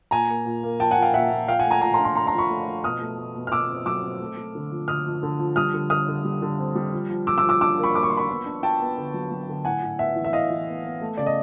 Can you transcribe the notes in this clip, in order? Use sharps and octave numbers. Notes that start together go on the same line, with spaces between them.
A#2 G#5 A#5
A#3
A#2
A#3
F3 G5 A5
F#5 G#5
A#2
F5 G5
A#2 E5 F#5
A#2
F3 F5 G5
F#5 G#5
A3
G#5 A#5
F3 G#5 A#5
A#5 C6
D4
A#5 C6
F3 A#5 C6
A#5 C6
F3
B5 C#6
A3
F3
B2 D#6 F6
A3
A3
B2
F6
B2 D6 E6
C4
F#3 D6 E6
C4
A3
A3
D3
F3
D3 D#6 F6
F3
D3
F3
G3 D#6 F6
D3
D3 D#6 F6
D3
G3
D3
C4
G3
F3
F3
F3 D6 E6
D6 E6
F3
D6 E6
D4 D6 E6
A#3
B5 C#6
A#3 D6
C#6
F3 C6
B5 C#6
B3
D4
D4 G5 A5
B3
D3
F#3
F#3
D3
A2 F#5 G#5
A2
B3 E5 F#5
E3
E5
A2 D#5 F5
E3
B3
B3
A3
C#3 D5
D#5